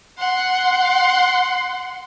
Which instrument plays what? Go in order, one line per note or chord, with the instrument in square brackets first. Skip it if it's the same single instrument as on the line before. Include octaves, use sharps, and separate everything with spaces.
[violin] F#5 C6